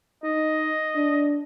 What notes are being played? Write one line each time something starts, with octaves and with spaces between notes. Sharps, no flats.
D#4 D#5
D4